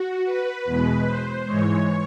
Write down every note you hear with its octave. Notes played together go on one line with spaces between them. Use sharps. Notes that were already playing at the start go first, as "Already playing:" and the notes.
Already playing: F#4
B4
E2 B2 G#3
C5
G#2 E3 G#3 C#5